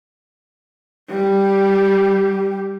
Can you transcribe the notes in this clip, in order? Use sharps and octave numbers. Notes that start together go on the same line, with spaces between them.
G3 G4